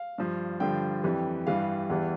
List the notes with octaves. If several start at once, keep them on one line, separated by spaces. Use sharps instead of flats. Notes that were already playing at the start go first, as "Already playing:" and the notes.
Already playing: F5
G2 F3
G2 D3 F3 G5
F2 E3 G3
G2 E3 G3 F5
E2 E3 G3